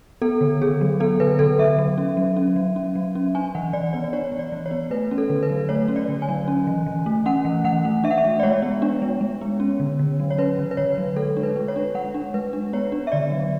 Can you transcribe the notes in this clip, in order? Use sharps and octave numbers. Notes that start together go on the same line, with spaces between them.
B3 A4
D3
D3 G#4
F#3
B3 A4
D3 B4
D3 A4
F#3 E5
F#3
C#4
F#3
C#4
F#3
C#4
F#3
C#4
D4 G#5
E3 F#5
E3 D5
B3 D5
D5
D4 C#5
E3
D5
E3
C#5
B3
A3 B4
C#4
A4
D3
B4
F#3
A3 C#5
C#4
D5
D3
G#5
F#3
C#4
E3
E3
A3
C#4 F#5
E3
E3 F#5
A3
D4 E5
F#5
E5
G#3
D5
G#3 C#5
B3
D4
G#3
G#3
B3
C#4
D3
D3
F#3
C#5
C#4 B4
D3
B4
D3 C#5
F#3
G#3 A4
D4
B4
G#3
C#5
D4
G#3 F#5
D4
G#3 B4
D4
B3 C#5
D4
E5
D3 D5
F#3